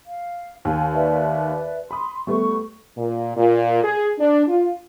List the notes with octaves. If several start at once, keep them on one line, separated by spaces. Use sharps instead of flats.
F5
D#2 G#5
B4 D5 E5
B5 C6 D#6
G3 A3 B3 C#6
A#2
A#2
G#4
D4
F4